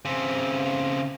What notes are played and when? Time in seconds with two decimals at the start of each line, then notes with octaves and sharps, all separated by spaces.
0.05 C#3 C4